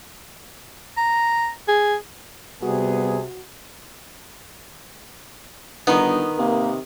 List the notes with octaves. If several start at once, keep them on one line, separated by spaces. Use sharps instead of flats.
A#5
G#4
C3 G3 B3 F#4 G#4
G1 D#3 B3 D#4
C3 A#3